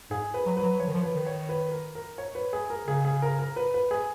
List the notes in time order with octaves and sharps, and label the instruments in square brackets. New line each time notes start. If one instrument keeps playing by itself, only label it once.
[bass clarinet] G#2 [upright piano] G#4
[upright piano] B4
[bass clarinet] F#3
[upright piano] B4
[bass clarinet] F#3
[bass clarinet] F3 [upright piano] C#5
[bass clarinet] D#3
F3
[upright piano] B4
[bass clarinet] D#3
[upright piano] C#5
B4
A#4
A#4
C#5
B4
G#4
A#4
[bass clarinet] C#3 [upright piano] G#4
[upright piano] G#4
A#4
A#4
B4
B4
G#4